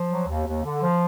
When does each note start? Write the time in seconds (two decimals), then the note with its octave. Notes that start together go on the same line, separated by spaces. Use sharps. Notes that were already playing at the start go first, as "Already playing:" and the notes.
Already playing: F3
0.09 F#3
0.27 D#2
0.46 D#2
0.63 D3
0.81 F3